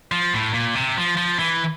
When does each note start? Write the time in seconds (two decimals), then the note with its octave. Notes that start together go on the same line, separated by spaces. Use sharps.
0.12 F3
0.33 A2
0.53 A#2
0.75 C3
0.96 F3
1.17 F3
1.39 E3